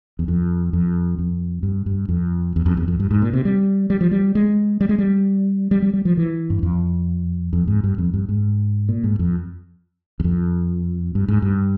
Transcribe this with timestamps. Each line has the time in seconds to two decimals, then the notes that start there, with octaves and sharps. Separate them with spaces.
0.19 E2
0.28 F2
0.73 F2
1.19 F2
1.63 G2
1.86 G2
2.09 F2
2.56 E2
2.66 F2
2.77 E2
2.88 F2
3.00 G2
3.11 G#2
3.22 A#2
3.33 C3
3.45 G3
3.90 G3
4.01 F3
4.11 G3
4.35 G#3
4.81 G3
4.89 G#3
4.99 G3
5.71 G3
5.82 G3
5.94 G3
6.05 F3
6.17 E3
6.50 G2
6.63 F2
7.53 F2
7.67 G#2
7.84 G2
7.98 F2
8.14 G2
8.29 G#2
8.89 A#2
9.04 G#2
9.19 F2
10.20 E2
10.24 F2
11.15 G2
11.28 G#2
11.42 G2